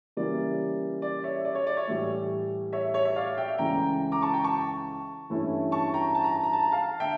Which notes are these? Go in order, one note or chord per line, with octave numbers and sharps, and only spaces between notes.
C#3 E3 G3 A#3 E4 D5
D5
C#5 E5
D5
C#5
D5
C#5 E5
A2 E3 G3
C#5 E5
C#5 E5
C#5 E5
D5 F5
E5 G5
C#2 C#3 E3 A3 G5 A#5
A#5 D6
A5 C#6
G5 A#5
A5 C#6
G2 E3 A3 C#4 E4
A5 C#6
G5 A#5
A5
A#5
A5
A#5
A5
A#5
F5 A5
D3 E5 G5